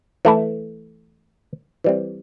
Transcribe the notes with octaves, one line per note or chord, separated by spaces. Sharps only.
E3 A3 E4
E3 G3 C4